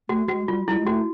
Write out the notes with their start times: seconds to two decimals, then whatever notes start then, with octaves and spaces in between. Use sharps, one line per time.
0.09 A3 F#4
0.28 G#3 F#4
0.48 G3 F4
0.68 G3 E4
0.77 G#3
0.87 A3 F#4